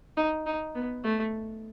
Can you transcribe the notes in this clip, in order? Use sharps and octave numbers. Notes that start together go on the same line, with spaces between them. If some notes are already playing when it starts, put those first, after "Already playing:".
D#4
D#4
B3
A3